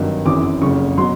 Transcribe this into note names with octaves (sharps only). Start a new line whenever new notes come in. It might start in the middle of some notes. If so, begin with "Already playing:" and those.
Already playing: G#1 G2 D#3 F#3
G#1 F#2 C#3 E3 D6
F#1 F2 C#3 C#6
B2 F#3 C6